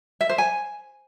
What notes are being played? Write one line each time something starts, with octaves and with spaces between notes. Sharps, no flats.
E5
C5
G#5